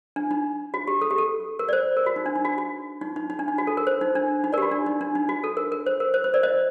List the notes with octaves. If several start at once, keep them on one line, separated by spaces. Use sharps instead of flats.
D4
D#4
F#4
G4
A4
G4
A4
A#4
D5
C5
A#4
F#4
D#4
D4
D#4
F#4
F#4
D#4
D#4
D#4
D4
D#4
F#4
A4
A#4
C5
D#4
D4
D#4
A#4 D5
G4
F#4
D4
D#4
D4
D#4
F#4
A4
A#4
A#4
C5
A#4
C5
C5
A#4 D5
C5 D#5